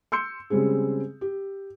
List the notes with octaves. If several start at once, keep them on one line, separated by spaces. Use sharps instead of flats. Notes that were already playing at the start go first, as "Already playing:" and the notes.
C6 E6 G6 C#7
C#3 G3 G#3 C4 G#4
G4